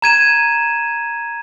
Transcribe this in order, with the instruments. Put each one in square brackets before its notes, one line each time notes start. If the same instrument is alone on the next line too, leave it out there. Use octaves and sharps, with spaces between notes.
[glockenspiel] A#5 G#6 D#7 E7